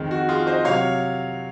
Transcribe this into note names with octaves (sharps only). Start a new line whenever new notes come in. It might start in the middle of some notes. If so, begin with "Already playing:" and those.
Already playing: F2 D#3 G#3
F#4
F4 G#4
C5 D#5
C3 F#3 C#5 F5